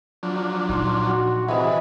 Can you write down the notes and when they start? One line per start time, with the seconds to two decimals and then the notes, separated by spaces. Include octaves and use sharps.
0.23 F3 F#3 D4
0.69 A#2 D#4 C6
1.06 F#4
1.49 C3 E3 G#4 B4 D#5 E5